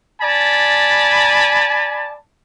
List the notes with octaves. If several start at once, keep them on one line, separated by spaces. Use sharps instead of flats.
D5 G#5 A5 B5